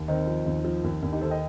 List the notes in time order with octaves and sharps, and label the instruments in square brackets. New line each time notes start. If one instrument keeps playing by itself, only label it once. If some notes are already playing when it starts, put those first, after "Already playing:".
Already playing: [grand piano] D#2
D#3 C4 D#4
F3
D#2
F3
D#2
D#2 D4
D#4 G4
D#3 A4 C5
D#5 G5